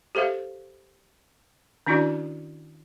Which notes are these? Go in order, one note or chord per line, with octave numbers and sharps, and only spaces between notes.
G4 A4 C5 E5 F5
D#3 C#4 D4 E4 F#4 D5